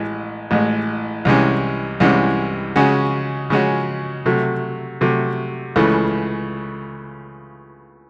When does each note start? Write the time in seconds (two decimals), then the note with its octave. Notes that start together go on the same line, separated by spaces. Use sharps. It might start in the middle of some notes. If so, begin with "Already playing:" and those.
Already playing: A1 A2 G#3
0.51 A1 A2 G#3
1.25 C2 C3 E3 G#3 C#4
2.00 C2 C3 E3 G#3 C#4
2.76 C#3 G#3 C#4 F#4
3.50 C#3 G#3 C#4 F#4
4.26 C3 F#3 A3
5.01 C3 F#3 A3
5.76 C#2 C#3 E3 A3